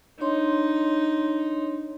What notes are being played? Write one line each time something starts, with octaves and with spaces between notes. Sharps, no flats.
D4 D#4 C#5 C6